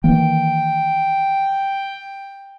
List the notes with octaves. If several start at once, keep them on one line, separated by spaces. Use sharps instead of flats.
D#3 E3 A#3 G5